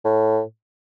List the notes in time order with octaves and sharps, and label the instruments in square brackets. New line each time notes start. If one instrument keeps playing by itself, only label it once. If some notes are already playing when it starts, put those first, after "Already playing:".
[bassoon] A2